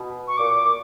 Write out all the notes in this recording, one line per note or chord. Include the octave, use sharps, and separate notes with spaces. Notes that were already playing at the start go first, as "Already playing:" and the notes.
Already playing: B2
C#6
A#2 D6
D6